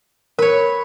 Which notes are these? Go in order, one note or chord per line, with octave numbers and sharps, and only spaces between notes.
A#4 B4 C#5